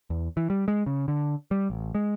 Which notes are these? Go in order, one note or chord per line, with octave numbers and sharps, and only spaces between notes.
E2
E3
G3
G#3
C#3
D3
G3
A1
G#3